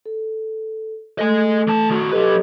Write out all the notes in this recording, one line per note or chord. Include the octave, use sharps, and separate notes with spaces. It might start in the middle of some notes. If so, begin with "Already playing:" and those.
A4
A3 A4 D#5 G#5
E3 A5
D#3 F#4
F#3 G4 A4 B4 D#5